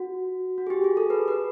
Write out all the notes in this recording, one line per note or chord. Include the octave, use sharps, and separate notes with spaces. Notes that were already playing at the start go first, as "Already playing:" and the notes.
Already playing: F#4
F#4
G#4
G4
G#4
A4
B4
B4